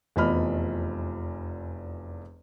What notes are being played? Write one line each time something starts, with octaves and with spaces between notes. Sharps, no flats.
F1 E2 F3 D#5 B5 F6